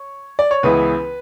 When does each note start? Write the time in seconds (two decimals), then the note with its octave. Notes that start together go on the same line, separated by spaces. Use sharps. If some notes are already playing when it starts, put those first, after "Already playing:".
Already playing: C#5
0.39 D5
0.51 C#5
0.63 C#2 C#3 E3 B3 E4 B4